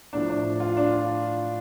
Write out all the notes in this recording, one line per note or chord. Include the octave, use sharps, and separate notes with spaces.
A2 F3 D4
D4
F4
D4
F4